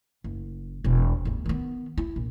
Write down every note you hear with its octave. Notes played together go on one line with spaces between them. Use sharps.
F#1
E1
G1 D2
D#3 B3
E4
A#1